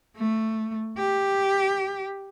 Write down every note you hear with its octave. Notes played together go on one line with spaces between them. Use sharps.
A3
G4